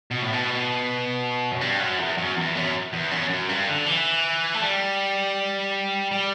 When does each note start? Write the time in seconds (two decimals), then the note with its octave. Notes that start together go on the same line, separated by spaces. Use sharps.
0.11 B2
0.22 A2
0.33 B2
1.51 F#2
1.61 G2
1.80 F#2
1.99 E2
2.18 F#2
2.36 E2
2.55 F#2
2.93 E2
3.11 F#2
3.30 F#2
3.49 G2
3.67 D3
3.86 E3
4.54 A3
4.61 G3
6.11 G3